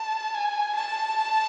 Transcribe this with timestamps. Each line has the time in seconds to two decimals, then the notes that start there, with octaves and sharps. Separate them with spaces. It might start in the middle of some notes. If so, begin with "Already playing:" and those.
Already playing: A5
0.34 G#5
0.75 A5